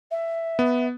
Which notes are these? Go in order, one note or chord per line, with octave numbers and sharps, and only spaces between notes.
E5
B3